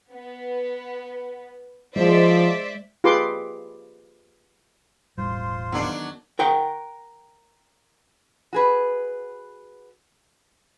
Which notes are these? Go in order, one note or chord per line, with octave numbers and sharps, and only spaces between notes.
B3
F3 G#3 C5 D5 E5
F4 G4 G#4 B4 C6 D6
E1 A1 G3 F4 C5
E2 D#3 F#3 D4 F#5
A#4 F#5 G5
F#4 G#4 B4